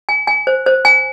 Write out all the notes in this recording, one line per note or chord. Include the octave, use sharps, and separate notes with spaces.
G#5
G#5
C5
C5
G#5